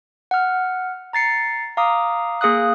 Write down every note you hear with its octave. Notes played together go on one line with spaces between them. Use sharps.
F#5 F6
A#5 A6 C7 C#7
F5 A#5 D6 D#6
A#3 G#4 F5 D#6 F#6